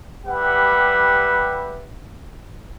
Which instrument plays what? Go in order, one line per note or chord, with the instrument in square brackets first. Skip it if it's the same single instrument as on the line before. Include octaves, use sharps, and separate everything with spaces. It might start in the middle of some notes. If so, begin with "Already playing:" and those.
[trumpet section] G3 G4 B4 E5 F#5